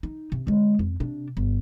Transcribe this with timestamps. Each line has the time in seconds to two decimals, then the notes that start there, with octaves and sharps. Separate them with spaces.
0.03 D#4
0.32 C3
0.47 D3 G#3
0.79 F2
1.00 C3 D4
1.37 G1